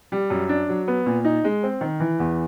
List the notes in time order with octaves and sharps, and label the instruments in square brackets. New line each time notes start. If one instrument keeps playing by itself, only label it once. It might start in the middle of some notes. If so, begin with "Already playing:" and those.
[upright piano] G3
F#2
D4
F#3
B3
A#2
D#4
G#3
C4
D#3
E3
E2